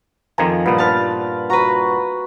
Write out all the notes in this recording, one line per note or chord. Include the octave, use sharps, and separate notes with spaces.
F2 D#3 F3 G#5 A#5
G2 A#2 B3 F#5
D#4 B4 C5 A5 F6 A6
F#4 B4 A#5